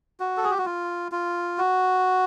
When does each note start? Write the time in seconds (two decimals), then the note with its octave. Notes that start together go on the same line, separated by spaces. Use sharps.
0.20 F#4
0.37 A4
0.44 G#4
0.51 G4
0.58 F#4
0.66 F4
1.12 F4
1.58 F#4